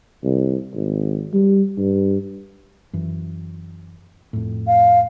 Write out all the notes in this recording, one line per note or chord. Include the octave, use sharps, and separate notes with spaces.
C2
G#1
G3
G2
F#2 E3
F2 A2
F5